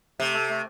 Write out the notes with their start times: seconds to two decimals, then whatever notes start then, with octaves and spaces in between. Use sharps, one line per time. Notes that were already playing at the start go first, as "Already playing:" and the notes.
0.20 C3 A3
0.34 A4
0.49 A3